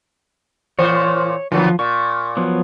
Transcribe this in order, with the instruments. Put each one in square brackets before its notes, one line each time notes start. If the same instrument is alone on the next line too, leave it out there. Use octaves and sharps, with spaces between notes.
[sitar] A#2 E3 C5 [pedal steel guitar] C#5
[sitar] D3 F#3 B3 [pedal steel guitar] F3
[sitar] A#2 [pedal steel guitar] C#6
[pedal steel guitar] F3 F#3 B3